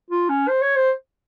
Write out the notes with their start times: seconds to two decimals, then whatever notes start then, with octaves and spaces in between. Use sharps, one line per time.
0.11 F4
0.29 C#4
0.48 C5
0.62 C#5
0.76 C5